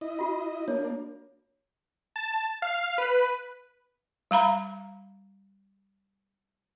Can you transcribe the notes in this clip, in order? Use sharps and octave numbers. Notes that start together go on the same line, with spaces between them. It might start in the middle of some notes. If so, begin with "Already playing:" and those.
E4 D#5
F4 F#4 B5
A#3 D4 C#5
A5
F5
B4
G3 F5 A#5 B5